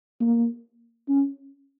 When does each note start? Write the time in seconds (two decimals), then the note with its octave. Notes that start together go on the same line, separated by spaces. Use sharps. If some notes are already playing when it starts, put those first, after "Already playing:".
0.21 A#3
1.08 C#4